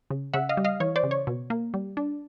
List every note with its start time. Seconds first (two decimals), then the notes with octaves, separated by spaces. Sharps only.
0.10 C#3
0.33 C#3 E5 F#5
0.49 D#5 F5
0.57 G3
0.64 D#5 F5
0.80 E3 C#5
0.96 C5 D5
1.04 C#3
1.11 C#5
1.27 B2
1.50 A#3
1.74 G3
1.97 D4